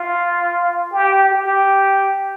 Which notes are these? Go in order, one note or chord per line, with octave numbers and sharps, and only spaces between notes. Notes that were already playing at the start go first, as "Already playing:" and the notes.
Already playing: F4
G4
G4